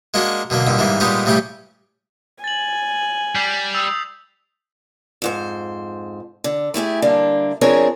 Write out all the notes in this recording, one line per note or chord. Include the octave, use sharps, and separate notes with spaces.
G#3 A#3 C#4 D4 F#4
B2 D3 F#3 A#3
G2 A#2 D3 D#3
G#2 D#3 E3 G3 A#3
A#2 G3 G#3 B3 D#4 G4
A1 C#3 G3 A3 C#4 G4
G#5 A6 F#7
G3 G6 B6 C7
D#6 E6 F7
F2 G#2 C5
D3
A3 E4 G4 G#4
D3 G3 A#3 D4
F3 C4 D4 G#4 A#4 C#5